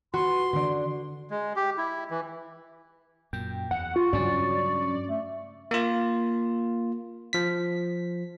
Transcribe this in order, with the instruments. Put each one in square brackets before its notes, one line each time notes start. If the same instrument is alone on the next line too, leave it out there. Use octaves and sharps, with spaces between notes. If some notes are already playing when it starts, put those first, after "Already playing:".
[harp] F#4 [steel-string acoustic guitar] B4 [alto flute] C6
[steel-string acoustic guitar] D3 D4
[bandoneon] G#3
G4
E4
E3
[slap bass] F#2 A#2 [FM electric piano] G5
[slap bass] E2 [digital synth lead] F#5
[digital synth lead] F4 [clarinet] C#6
[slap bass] G2 D4 [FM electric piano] C#3 F#3 C#4 [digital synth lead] D5
[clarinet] A3
[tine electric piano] A#3 F4
F3 B6